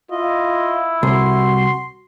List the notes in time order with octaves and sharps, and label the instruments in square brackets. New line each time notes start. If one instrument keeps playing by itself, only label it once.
[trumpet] E4 [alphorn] F4 [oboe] D#5
[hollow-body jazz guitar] C2 [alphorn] F#4 [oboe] C6